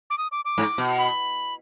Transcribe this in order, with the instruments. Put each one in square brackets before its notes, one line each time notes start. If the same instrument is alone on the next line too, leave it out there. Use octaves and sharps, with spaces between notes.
[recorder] D6
D#6
D6
D6
[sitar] G#2
B2
[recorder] B5